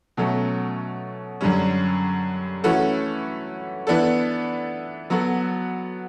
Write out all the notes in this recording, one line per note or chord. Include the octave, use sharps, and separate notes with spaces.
B2 F#3 A3 C#4
F#2 D3 G3 C#4
E3 A3 C#4 F#4 A4
E3 B3 D4 A4
F#3 B3 F#4 A4